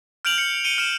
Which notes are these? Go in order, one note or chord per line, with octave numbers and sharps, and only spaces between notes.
F6 G6 D7 F7 F#7
C#7
C#7 D#7 G7
F6 D7 E7